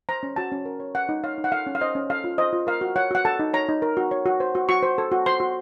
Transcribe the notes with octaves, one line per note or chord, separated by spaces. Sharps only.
C5 A#5
C#4
F#4 A5
C#4
A#4
C#5
A4 F#5
D#4
C#5 F5
D#4
F#5
A4 F5
C#4
F5
C5 D#5
C#4
A4 F5
F4
C5 D#5
F4
A#4 F5
F#4
C#5 F#5
F#4 F#5
A4 A5
D#4
C#5 A#5
D#4
A#4
F#4
C#5
F#4
C5
F#4
F#4 C#6
C5
A4
F#4
C5 C6
F#4